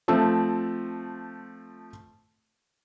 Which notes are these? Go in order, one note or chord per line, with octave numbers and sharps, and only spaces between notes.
F3 A3 C4